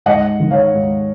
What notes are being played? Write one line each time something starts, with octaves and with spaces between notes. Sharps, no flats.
G#2 D#5 F#5
D#3
C#5 F5
G#2